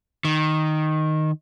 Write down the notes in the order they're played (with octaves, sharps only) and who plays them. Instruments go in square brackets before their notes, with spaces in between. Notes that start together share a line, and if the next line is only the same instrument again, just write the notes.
[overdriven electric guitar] D#3